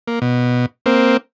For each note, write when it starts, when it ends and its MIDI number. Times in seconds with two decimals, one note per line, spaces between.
0.08 0.19 58
0.22 0.66 47
0.86 1.17 58
0.86 1.17 60